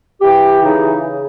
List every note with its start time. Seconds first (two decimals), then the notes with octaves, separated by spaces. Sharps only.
0.21 E3 G4
0.62 C#3 D#4